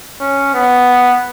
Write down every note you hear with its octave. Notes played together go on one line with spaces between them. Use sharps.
C#4
B3